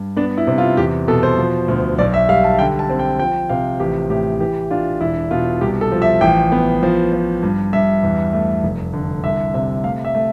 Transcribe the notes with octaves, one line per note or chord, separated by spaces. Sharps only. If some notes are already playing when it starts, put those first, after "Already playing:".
Already playing: G2
B3 D4
E4
C3
F4
E2 G4
B2 A4
C5
F3
D2
B1 D5
E5
G3 F5
A5
D3 G5
A5
C4
G5
F3 G5
C3 F5
A1 G4
A2 G4
E3 G4
D4 F4
E1 E4
B2 F4
C2 G4
A4
F3
E5
A1 G5
B3
F3
F3
G2
G2 E5
E2
A3
F1
D3
C2 E5
C3 E5
A3 F5
E5
A3